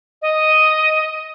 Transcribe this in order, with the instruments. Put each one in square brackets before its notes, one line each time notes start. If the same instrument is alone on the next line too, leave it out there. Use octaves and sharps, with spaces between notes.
[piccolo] D#5